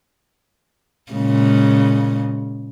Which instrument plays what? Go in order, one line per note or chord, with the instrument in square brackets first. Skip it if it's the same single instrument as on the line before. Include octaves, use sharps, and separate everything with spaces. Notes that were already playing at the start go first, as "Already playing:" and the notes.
[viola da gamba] A#2 C#3 G#3